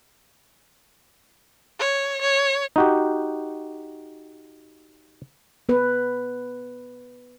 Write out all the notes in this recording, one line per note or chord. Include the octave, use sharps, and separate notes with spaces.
C#5
C#5
D#4 F#4 G4
B3 B4